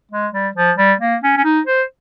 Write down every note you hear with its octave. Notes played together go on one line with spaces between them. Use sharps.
G#3
G3
F3
G3
A#3
C#4
C#4
D#4
C5